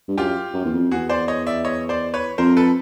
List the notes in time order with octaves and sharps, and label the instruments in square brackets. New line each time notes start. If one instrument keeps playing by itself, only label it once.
[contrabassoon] G2
[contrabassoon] F#2 [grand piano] F4 G4
[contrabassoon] F#2
E2
F2
[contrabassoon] E2 [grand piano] F#4 G#4
[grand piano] C5 D5
C#5 D#5
D5 E5
C#5 D#5
C5 D5
B4 C#5
[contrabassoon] F2 [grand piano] A#4 C5
[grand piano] A4 B4